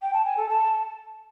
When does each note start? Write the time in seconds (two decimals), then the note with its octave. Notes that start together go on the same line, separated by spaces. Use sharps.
0.01 G5
0.13 A5
0.24 G#5
0.36 A4
0.48 A5